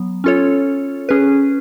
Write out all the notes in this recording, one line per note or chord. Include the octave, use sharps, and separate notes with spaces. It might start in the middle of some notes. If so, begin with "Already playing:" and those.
Already playing: F#3 B3
C#4 F4 A4 C#5
C#4 G#4 B4